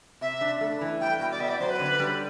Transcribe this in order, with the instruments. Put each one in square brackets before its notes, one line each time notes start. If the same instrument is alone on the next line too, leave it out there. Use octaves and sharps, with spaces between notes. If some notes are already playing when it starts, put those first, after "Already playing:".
[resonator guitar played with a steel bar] C3 [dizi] E5
[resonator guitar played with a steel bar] D4
A3
E3
[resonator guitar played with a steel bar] G3 [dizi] G5
[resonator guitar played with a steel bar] B2 [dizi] G5
[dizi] D5
[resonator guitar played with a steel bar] B3 [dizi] E5
[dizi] D5
[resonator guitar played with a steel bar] F#3 [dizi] C5
[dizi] B4
[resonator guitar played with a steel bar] D3
G3